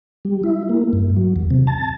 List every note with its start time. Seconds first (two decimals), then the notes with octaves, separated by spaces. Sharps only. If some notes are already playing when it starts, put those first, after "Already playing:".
0.25 G3
0.44 E4
0.69 A#3
0.93 G2
1.16 F#3
1.36 E2
1.50 C3
1.67 A5